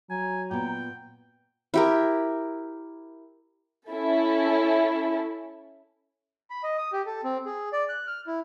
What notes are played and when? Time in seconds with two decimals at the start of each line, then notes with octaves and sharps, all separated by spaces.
0.10 F#3 G#5 A#5
0.51 A#2 B3 G5
1.74 E4 G4 A#4
3.92 C#4 E4 A4
6.50 B5
6.63 D#5
6.78 D#6
6.92 G4
7.06 A4
7.24 C4
7.46 G#4
7.73 D5
7.89 F#6
8.07 F6
8.27 E4